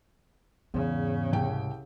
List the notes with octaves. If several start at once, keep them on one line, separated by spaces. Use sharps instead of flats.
E2 G#2 C#3
C2 G5